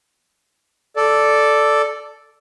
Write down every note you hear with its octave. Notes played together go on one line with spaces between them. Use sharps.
A4 D5